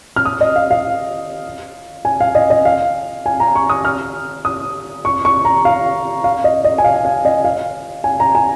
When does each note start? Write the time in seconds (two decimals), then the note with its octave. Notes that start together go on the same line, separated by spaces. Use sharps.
0.16 F6
0.25 D#6
0.41 D#5
0.56 F5
0.71 F5
2.05 G#5
2.20 F5
2.35 D#5
2.50 D#5
2.65 F5
3.26 G#5
3.40 A#5
3.56 C#6
3.70 D#6
3.85 F6
4.45 D#6
5.05 C#6
5.25 C#6
5.45 A#5
5.65 F5
6.24 F5
6.44 D#5
6.64 D#5
6.78 G#5
6.84 F5
7.05 F5
7.25 D#5
7.45 F5
8.04 G#5
8.20 A#5
8.35 G#5